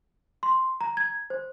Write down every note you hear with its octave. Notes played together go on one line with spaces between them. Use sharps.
C6
A#5
G#6
C5